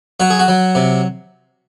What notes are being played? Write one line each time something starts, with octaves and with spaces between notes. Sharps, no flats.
F#3 F#4
G#4
F#4
F#3
C3